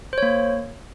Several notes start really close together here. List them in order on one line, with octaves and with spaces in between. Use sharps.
C5 C#5 A#3